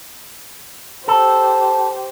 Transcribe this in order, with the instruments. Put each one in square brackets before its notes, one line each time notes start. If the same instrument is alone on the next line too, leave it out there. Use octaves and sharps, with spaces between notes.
[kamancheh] G4 C5 [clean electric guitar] A4